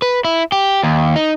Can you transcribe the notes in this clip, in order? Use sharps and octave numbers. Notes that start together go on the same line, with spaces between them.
B4
E4
G4
D#2
D#4